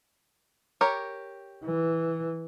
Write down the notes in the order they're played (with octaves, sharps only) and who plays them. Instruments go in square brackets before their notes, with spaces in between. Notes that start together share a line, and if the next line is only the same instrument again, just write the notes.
[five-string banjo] G4 A#4 C#5
[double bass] E3